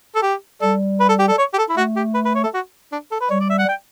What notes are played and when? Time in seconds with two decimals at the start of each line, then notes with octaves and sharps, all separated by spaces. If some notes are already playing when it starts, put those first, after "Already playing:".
0.15 A4
0.22 G4
0.61 G3 A4
1.00 B4
1.09 A4
1.19 G4
1.28 A4
1.38 C#5
1.53 G4
1.58 A4
1.69 E4
1.76 A3 F#4
1.96 G4
2.14 B4
2.25 B4
2.35 C#5
2.43 A4
2.54 F#4
2.92 D4
3.11 A4
3.20 B4
3.30 G3 C#5
3.40 D5
3.50 E5
3.59 F#5
3.68 G5